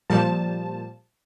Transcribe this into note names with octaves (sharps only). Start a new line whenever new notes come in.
A#2 F3 G3 A5